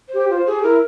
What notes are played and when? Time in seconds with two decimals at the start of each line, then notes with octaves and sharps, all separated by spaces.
0.08 C5
0.14 G4
0.30 F4 C5
0.46 G4 G#4
0.63 E4 A#4